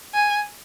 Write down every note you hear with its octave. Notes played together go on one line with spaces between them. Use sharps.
G#5